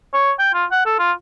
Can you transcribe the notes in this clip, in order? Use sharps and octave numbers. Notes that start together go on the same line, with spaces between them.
C#5
G5
F4
F#5
A4
F4